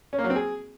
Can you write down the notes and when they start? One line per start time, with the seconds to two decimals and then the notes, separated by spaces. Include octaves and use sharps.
0.13 C#4
0.18 A#3
0.24 F#3
0.30 C4
0.36 G#4